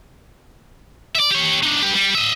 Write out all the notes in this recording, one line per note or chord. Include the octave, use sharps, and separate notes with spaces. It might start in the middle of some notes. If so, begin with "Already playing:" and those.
D5 E5
G4 C#5
D4 D#4
G4 B4
G3
D#5 E5